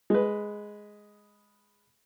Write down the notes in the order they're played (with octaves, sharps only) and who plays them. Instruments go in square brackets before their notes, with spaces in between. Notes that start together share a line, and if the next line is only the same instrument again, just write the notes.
[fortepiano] G#3 B4